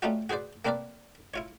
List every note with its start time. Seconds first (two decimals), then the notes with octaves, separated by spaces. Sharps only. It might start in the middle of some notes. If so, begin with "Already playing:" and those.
0.02 G3 A3 C#4 D#4 F4 F#4
0.29 F#4 G#4 B4 C5 D5
0.65 A#3 C4 D4 A#4 B4 D5
1.34 E4 F4 C#5